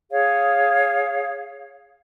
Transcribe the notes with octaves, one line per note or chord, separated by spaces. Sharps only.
G#4 C#5 F5